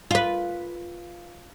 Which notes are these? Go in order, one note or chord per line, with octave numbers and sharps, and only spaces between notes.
F4 B4